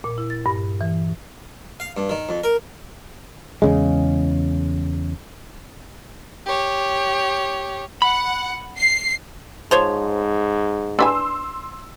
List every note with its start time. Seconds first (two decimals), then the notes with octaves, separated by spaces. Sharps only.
0.04 A#2
0.18 E4
0.30 A6
0.46 G2
0.81 E3
1.80 F5
1.97 G2
2.10 D#3
2.29 F2
2.44 A#4
3.62 E2 C#3 G#3
6.46 G4 C#5
8.02 F#5 B5
8.78 C7
9.71 G#2 F3 C5 C#5
10.99 D4 B4 G#5 C6 E6